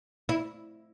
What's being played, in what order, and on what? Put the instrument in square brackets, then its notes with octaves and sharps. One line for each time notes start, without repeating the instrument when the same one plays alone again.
[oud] E4